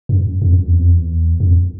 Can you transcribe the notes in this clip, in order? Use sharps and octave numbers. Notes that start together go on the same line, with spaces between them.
F#2
F2
F#2
E2
F2
E2
F2